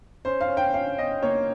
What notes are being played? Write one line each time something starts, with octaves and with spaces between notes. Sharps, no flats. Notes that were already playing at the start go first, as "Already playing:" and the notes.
C#4 C5
F5
C#4
G5
C#4 F5
C#4 D#5
A#3 C#5